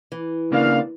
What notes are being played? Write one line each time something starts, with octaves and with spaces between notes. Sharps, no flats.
E3
C#3 A#3 D4 F5